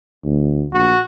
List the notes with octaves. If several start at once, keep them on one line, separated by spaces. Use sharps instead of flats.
D2
A#1 F#4